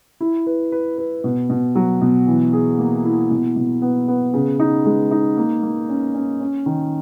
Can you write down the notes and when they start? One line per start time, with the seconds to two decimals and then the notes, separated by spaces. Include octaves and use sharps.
0.21 E4
0.47 B4
0.72 B4
0.98 B4
1.24 B2
1.50 B2
1.75 F#3
2.01 B2
2.27 E3
2.53 G#4
2.79 A#3
3.05 E4
3.31 B2
3.56 B2
3.82 B3
4.08 B3
4.34 C#3
4.60 D#4
4.85 G#3
5.11 D#4
5.37 A#3
5.63 A#3
5.89 C#4
6.15 C#4
6.41 C#4
6.66 D#3